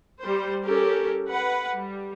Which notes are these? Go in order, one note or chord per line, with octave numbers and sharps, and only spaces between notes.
G3 C5
C#4 G4 A4 A#4
B4 F#5
G3